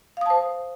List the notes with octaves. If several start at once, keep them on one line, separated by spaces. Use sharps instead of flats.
C5 F5 A5 D#6